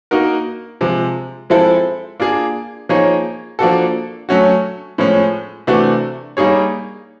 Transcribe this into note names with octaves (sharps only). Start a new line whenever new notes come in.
A#3 D#4 F#4 A#4
C3 F3 G#3
F3 G#3 C4 E4 A4
A#3 D4 F4 G#4
F3 A#3 D#4 G#4 C#5
F3 A#3 D4 F#4 A4
F#3 A3 C#4 F#4
A2 F3 G#3 C#4
C3 E3 A3 D4 F#4
G3 A#3 D#4 G#4 C#5